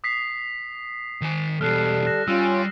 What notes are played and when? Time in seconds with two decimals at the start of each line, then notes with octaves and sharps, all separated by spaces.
0.04 D#6 B6 C7
1.21 D#3 G#5
1.61 E2 B2 G3 A4 F6 F#6 C7
2.06 F#6 A#6 E7
2.28 G3 C#4 F4 E6